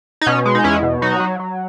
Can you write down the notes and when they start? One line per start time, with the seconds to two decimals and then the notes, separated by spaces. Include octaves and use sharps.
0.21 D#4
0.27 B2 C#4
0.45 G#3
0.55 D#4
0.64 E2 C#4 E4
0.83 B2
1.02 F#3 D#4 F#4
1.20 F#3
1.40 F#3